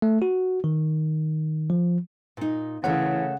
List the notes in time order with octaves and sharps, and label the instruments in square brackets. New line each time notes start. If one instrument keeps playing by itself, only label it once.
[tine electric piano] A3
F#4
D#3
F3
[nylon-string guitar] A#2 D#4
[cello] C#3 [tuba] E3 [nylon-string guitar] A3 A#4 C#5 [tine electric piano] F#5